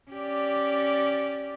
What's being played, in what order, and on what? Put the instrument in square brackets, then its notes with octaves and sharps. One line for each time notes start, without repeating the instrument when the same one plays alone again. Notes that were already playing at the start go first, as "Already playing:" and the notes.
[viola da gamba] C#4 G4 D5